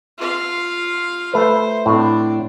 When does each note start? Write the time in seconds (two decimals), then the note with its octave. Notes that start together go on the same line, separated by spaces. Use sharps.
0.18 F4 F5
1.34 A3 B4 C5
1.86 A2 C4 D4